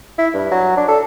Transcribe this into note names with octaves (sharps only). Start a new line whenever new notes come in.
E4
G2
F#3
D4
A4